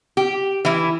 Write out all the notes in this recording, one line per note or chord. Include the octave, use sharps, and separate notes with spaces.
G4
E3 E4